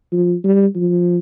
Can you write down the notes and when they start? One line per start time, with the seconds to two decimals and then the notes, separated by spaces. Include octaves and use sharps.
0.12 F3
0.44 G3
0.76 F3